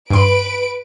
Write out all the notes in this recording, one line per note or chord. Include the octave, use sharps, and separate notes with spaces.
G2 B4 C6 D7